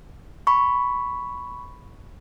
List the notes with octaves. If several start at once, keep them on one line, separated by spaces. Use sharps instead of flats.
B5 C#6